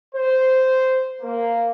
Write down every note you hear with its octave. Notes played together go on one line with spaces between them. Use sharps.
C5
A#3